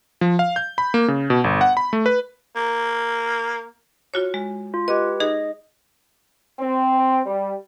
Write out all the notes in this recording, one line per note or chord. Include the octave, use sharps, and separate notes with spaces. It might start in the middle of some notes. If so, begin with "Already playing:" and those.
F3
F5
G6
B5
A#3
C#3
B2
G1
F#5
B5
A3
B4
A#3
F4 F#4 C#5
G#3
F4
G4 B4 D#5
D#4 G#4 D#5
C4
G3